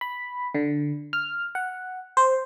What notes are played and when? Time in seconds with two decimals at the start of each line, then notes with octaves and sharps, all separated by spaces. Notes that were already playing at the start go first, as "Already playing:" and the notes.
0.01 B5
0.55 D3
1.13 F6
1.55 F#5
2.17 C5